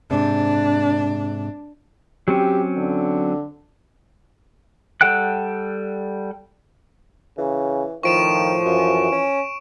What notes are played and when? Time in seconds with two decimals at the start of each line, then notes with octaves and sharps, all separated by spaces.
0.11 G#2 C3 D4
2.28 F#3 C4 C#4 G4
2.77 D3
5.01 G3 A4 F#5 G5 F#6
7.38 C#3 E3
8.03 A2 D#3 F3 C#6 D7 E7
8.65 F#2 E3
9.12 C#4